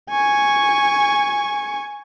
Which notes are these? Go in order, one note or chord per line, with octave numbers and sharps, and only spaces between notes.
G#5 C#6